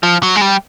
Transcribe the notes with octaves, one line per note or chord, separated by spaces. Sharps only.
F3
F#3
G#3
G3